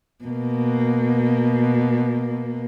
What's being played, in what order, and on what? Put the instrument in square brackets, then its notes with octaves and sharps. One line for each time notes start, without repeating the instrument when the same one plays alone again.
[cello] B2 A#3